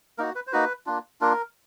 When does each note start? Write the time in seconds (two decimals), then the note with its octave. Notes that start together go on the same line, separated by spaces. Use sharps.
0.18 A#3 D#4 F#4 A#4
0.35 B4
0.47 C5
0.52 A#3 D#4 F#4 B4
0.86 A#3 D4 F4
1.21 A#3 D4 F4 A#4